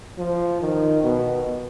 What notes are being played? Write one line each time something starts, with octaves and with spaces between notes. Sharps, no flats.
F3
D#3
B2